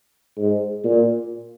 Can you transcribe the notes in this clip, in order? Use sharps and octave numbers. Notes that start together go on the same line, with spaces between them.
G#2
A#2